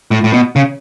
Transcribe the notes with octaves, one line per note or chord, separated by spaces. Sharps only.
A2
A2
B2
C#3